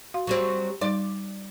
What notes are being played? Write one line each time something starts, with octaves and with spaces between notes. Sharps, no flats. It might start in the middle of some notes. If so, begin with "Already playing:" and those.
F#4 F5 C6
F#3 G3 C4
G3 D#4 D5 C6